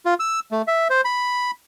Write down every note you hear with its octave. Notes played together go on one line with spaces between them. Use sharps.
F4
E6
A3
E5
C5
B5